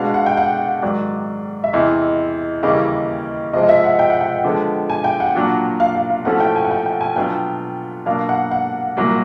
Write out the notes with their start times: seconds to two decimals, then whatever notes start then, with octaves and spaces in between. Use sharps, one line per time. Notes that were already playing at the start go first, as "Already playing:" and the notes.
Already playing: B2 G#3 B3 D4 F#4 F5
0.14 F#5
0.26 G5
0.37 F#5
0.82 G#2 D#3 F#3 D5
1.64 E5
1.73 E2 C3 E3 D#5
2.63 D#2 C#3 E3 G3 A#3 D#5
3.53 C3 F3 G#3 C4 F4 D#5
3.63 D#5
3.69 E5
3.84 F#5
3.99 G5
4.10 F#5
4.20 G5
4.44 D3 F3 G#3 B3
4.90 G#5
5.04 G5
5.20 F#5
5.35 A#2 F#3 A#3 D4 F4
5.80 F5
5.95 F5
6.10 F5
6.25 A2 F3 A3 C#4 F#4 F#5
6.40 G5
6.56 G#5
6.65 F#5
6.71 G5
6.86 G5
7.01 G#5
7.16 B2 F#3 B3 D4 F4 G5
8.06 B2 F#3 A#3 D4 F5
8.29 F#5
8.51 F#5
8.97 C2 A#2 F#3 A#3